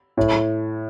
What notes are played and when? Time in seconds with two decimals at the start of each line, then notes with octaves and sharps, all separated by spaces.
0.17 A2